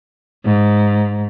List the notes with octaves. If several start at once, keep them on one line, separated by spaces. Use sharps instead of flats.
G#2